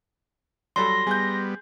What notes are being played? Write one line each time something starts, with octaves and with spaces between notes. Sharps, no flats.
F#3 G3 A4 C6 A#6
G3 B3 G#4 G6